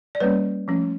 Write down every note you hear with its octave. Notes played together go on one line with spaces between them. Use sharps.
D5
G3 A#3 C#4 B4 C#5
F3 A3 C#4